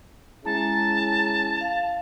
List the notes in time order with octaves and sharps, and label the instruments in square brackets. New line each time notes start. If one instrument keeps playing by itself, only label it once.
[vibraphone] G#3 A#5 [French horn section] C#4 E4 G#4 [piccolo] A5
[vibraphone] F5